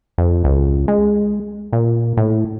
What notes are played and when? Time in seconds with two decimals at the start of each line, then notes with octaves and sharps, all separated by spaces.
0.18 F2
0.44 C#2
0.88 G#3
1.73 A#2
2.17 A2